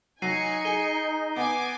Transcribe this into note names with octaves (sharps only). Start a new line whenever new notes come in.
F#3 D#4 G#5 A#6 C7 C#7 D#7
G#4 D#7 G7
B3 G#5 D6